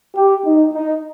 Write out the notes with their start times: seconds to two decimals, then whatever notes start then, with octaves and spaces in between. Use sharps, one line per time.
0.16 G4
0.45 D#4
0.73 D#4